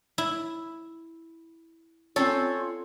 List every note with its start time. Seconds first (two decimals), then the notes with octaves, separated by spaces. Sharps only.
0.18 E4
2.16 C4 C#4 F4 A4 C#5